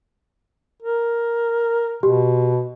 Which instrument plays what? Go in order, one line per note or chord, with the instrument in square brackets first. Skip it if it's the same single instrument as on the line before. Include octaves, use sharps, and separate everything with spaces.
[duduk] A#4
[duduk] B2 [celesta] G4